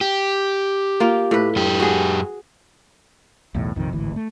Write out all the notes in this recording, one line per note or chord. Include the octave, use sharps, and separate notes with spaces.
G4
A#3 F4
A2 B4
F#2 G4
F#4 G#4
B1 E2 A2
A#1 F2 C3 D#3
D1 G#1 D2 E3
A3